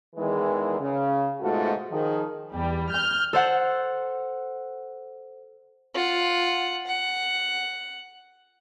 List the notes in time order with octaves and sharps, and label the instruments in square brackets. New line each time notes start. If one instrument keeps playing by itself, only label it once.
[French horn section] E2 D#3 E3 G#3 G#4
C#3
G#2 B2 A3 F4 F#4 A4
D#3 F3 G#4
[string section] E2 G3
F6 G6
[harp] A4 C5 F#5 A6
[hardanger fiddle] F4 F#5
F#5